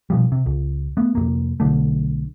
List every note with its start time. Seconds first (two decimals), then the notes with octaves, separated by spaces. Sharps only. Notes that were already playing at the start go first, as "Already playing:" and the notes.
0.10 B2 F3 G3
0.32 C3
0.46 C#2
0.97 A3 B3
1.15 F1 F2 A#3
1.60 B1 D3 A3